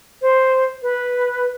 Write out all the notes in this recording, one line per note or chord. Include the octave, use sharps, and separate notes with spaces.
C5
B4